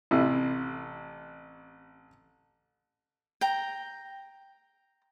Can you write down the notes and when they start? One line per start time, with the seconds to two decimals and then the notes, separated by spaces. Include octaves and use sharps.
0.11 A1 C3 E4
3.41 G5 A#5